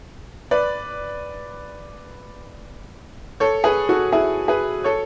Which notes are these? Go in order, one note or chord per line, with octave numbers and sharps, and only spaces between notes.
B4 D5
A4 C#5
G#4 B4
F#4 A4
E4 G#4
G#4 B4
A4 C#5